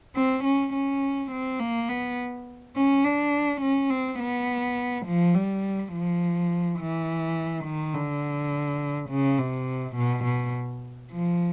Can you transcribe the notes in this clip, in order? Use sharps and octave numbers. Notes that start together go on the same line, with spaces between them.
C4
C#4
C#4
C4
A#3
B3
C#4
D4
C#4
C4
B3
F3
G3
F3
E3
D#3
D3
C#3
C3
B2
B2
F3